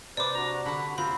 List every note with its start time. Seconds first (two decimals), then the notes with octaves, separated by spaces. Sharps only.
0.17 C3 B4 C5 D5 D6
0.35 D4 F#4 A#5
0.66 D3 F#5 B5
0.98 D#2 C3 C4 F4 A#5 B5